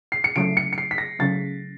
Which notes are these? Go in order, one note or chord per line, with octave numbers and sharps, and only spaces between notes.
C7
C#7
C#3 F#3 A3 D7
C#7
C#7
C7
B6
A#6
C#3 F#3 A3 A6